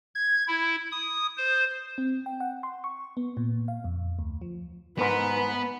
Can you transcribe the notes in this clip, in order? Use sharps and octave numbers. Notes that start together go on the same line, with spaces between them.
G#6
E4
D#6
C5
C4
G5
F#5
C6
C#6
B3
A#2
F5
F2
D2
F3
G#2 B3 A#4 B4